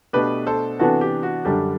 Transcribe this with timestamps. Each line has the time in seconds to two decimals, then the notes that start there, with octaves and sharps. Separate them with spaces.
0.13 B2 A3 D4 G4 B4
0.47 A4 C5
0.79 C3 E3 B3 D4 F#4 A4
1.01 G4
1.23 F#4
1.45 F#2 D3 G3 D4 G4